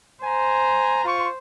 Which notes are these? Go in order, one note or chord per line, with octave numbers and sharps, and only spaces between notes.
C5 G#5 A#5
F4 C#6